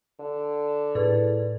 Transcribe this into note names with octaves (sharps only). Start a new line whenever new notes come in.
D3
A2 G#4 B4 D5